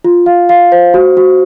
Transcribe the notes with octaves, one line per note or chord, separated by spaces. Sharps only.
F4
F5
F5
C5
F#4
F#4